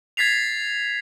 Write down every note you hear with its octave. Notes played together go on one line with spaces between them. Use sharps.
G#6 A6 B6 C7 F7